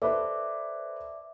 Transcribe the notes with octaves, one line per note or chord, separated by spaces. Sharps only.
A4 B4 C5 D5 E5 D6